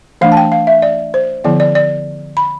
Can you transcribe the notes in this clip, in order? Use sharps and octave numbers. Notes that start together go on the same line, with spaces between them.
E3 A3 D4 F5
A5
G5
F5
E5
D5
C5
D3 F3 B3 E4 D5
D5
D5
B5